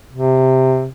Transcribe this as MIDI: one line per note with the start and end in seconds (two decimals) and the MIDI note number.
0.13 0.88 48